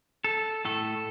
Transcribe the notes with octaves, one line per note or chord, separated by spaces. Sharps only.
A4
A2 A3 A4